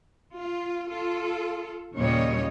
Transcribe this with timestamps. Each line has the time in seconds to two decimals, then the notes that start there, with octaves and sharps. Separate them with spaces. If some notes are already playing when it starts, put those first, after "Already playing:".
0.38 F4
0.88 F4 A4
1.96 D#2 A#2 C#3 G3 C#5 D#5